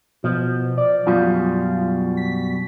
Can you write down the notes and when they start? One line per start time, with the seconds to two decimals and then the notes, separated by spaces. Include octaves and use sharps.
0.24 B2 F3
0.78 D5
1.07 F#2 B2 G3 F4
2.17 B6